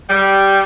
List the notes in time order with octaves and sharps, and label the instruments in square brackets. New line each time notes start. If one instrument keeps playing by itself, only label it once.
[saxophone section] G3